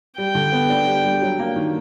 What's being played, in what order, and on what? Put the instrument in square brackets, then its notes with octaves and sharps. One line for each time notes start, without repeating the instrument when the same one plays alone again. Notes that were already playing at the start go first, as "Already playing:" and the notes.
[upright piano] G3 [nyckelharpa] G5
[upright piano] D3
B3
D4
G3
G3
F#3
A#3
D#3